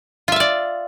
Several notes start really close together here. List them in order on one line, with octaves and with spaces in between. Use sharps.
F4 E5 F5 D5